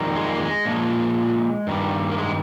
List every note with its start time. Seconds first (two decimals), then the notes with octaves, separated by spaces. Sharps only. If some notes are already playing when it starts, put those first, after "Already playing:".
Already playing: F2 D#3 G3
0.15 G#3
0.26 A#3
0.38 G#3
0.65 A#2 F3
1.67 G2 D#3 G3
2.11 A#3
2.18 G#3